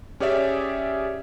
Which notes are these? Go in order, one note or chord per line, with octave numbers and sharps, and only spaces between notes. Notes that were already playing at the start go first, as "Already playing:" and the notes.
C#4 G4 G#4 C#5 D5 E5